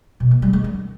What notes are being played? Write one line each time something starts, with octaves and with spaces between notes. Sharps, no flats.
B2
A#3
G3
G#3
D#3